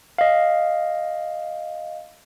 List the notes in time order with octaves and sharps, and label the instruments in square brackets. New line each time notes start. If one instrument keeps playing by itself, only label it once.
[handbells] D#5 F5